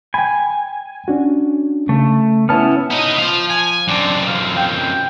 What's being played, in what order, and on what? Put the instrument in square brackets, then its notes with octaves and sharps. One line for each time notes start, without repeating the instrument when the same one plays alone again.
[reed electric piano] G5 B5 [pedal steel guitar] G#5
[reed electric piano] C#4 D4 F#4
[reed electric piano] C#3 [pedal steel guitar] A3
[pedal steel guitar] B3 C#4 E4 [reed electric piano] A5 F6
[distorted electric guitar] B3 D#5 [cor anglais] D#4
[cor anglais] F3 [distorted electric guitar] C5 F5
[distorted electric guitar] G#5
[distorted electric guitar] F#2 C4 [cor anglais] D4
[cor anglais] F5
G5